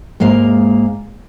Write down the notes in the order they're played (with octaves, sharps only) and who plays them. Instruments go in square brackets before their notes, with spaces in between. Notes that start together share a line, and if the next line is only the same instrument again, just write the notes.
[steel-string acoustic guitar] G#2 G#3 A#3 F5